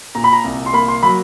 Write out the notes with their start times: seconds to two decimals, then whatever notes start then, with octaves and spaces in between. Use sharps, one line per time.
0.15 A#2 A#5
0.24 B5
0.33 A#5
0.44 C2
0.66 C6
0.73 A#3 B5
0.88 C6
1.03 F#3 B5